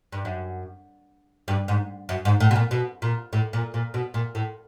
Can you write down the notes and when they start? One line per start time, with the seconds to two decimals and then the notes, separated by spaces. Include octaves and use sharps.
0.12 G2
0.25 F#2
1.48 G2
1.68 G#2
2.09 F#2
2.25 G#2
2.40 A2
2.51 B2
2.56 A#2
2.71 B2
3.02 A#2
3.33 A2
3.53 A#2
3.74 A#2
3.94 B2
4.14 A#2
4.35 A2